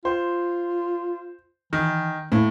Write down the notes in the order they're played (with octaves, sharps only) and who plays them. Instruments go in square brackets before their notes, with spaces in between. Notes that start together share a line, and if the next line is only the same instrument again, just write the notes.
[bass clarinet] F4 [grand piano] C5
[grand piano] D#3 [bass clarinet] E3
[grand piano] A2 [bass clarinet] A#3